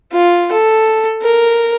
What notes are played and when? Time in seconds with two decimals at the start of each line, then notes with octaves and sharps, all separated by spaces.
0.12 F4
0.52 A4
1.22 A#4